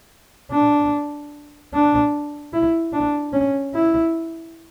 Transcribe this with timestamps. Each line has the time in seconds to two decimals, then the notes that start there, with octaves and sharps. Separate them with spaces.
0.52 D4
1.73 D4
2.53 E4
2.93 D4
3.33 C#4
3.74 E4